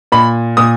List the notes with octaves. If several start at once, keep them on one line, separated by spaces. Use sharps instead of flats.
A#2 B5
A#2 D#6